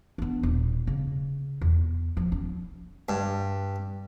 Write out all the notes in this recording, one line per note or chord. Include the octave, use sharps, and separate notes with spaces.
B3 D4
D#1
C#3
E2
F3
C#4
G2